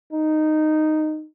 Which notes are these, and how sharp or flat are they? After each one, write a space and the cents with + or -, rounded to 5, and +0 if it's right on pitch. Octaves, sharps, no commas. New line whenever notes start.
D#4 -10